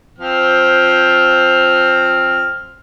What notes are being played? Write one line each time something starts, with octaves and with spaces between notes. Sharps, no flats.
F3 C4 F6